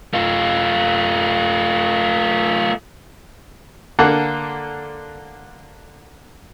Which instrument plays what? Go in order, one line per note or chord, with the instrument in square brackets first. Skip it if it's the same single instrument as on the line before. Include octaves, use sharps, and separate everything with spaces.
[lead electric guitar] A3 F4
[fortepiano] D3 A#3 F#5 A5